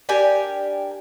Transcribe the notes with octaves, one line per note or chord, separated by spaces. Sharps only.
D4 G4 A#4 G#5